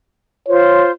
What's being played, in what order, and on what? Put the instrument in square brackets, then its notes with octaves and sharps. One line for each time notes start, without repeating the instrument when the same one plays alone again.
[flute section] F4 C5 [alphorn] C#5